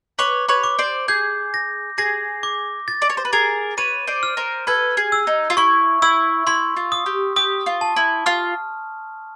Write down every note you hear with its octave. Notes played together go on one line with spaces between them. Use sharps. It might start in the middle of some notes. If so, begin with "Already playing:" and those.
B4 C#5 D6
B4 C#5
D6
C5 D5
G#4 G6
A#6
G#4 A#6
D6
A6
D5
C#5
C5
B4
G#4 A#4 A6
B4 C#5 D#7
C5 D5
F6
A#4 C5
A4 B4 G#6
G#4
E6
D#4
F4
E4 C#6
E4 E6
E4 C6
F4
D#6
G4
G4 D#6
F4
A5
E4
F4 F6